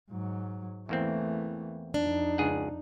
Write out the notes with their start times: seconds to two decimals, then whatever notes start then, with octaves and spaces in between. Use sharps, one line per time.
0.11 G#2 F#3
0.89 E2 E3 A3 A#3 C4
1.94 F2 D4 D#4
2.38 C#2 G#4 F#5